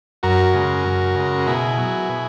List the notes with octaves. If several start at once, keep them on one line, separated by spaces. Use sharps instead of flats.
F#2 F#4 A#4
C#3 G#3
F#2
C#3 G#3
B2 E4 G#4
F#3
B2